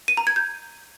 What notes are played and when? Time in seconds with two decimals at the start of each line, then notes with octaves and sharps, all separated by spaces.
0.08 D#7
0.17 A#5
0.27 G#6
0.36 G6